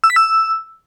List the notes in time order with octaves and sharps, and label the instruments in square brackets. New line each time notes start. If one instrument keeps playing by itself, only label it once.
[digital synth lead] E6
B6
E6